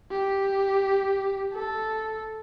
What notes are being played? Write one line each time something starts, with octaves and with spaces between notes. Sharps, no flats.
G4
A4